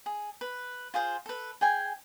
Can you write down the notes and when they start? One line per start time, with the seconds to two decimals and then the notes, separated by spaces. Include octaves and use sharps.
0.06 G#4
0.41 B4
0.94 F4 G#4 C5
1.26 A4 B4
1.61 G#4 G5 G#5